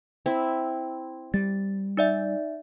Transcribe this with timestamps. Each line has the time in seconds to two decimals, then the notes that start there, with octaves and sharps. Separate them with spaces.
0.26 C4 E4
1.34 G3 A6
1.97 D#4 D5 E5